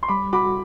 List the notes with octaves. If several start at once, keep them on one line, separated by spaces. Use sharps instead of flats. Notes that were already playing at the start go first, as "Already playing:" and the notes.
C6
G3 B5 D6
F#4 B5 D6